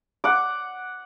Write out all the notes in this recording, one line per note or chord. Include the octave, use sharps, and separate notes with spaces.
F#5 D6